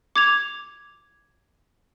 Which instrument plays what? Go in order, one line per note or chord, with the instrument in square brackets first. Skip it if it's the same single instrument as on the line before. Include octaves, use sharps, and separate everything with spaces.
[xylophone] D6 G#6 F7